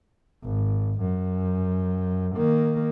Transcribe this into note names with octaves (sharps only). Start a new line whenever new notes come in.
G#1
F#2
D#3 A#3